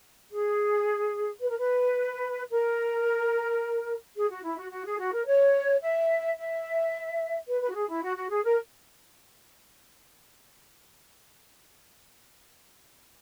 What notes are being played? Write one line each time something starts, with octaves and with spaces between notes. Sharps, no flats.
G#4
B4
A#4
B4
A#4
G#4
F#4
E4
F#4
F#4
G#4
F#4
A#4
C#5
E5
E5
B4
B4
F#4
G#4
E4
F#4
F#4
G#4
A#4